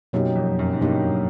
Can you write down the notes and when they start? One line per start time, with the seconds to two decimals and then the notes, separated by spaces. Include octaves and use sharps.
0.13 F#2 B2 F#3 A#3 D#4 G4
0.36 F2
0.59 F#2
0.73 G#2
0.81 G2 B2 F#3 A#3 D#4 G4